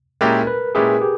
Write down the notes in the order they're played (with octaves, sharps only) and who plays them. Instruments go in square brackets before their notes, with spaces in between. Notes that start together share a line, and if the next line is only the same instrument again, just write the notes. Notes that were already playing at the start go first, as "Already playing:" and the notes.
[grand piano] A#2 G#3 C#4 E4 G4 [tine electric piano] A#4
[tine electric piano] B4
[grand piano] A#2 G#3 C#4 E4 G4 [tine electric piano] G#4
[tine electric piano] G4